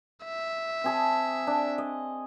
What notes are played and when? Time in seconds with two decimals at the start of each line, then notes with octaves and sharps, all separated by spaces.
0.25 E5
0.84 C4 G#4 A5
1.47 D4
1.78 D#5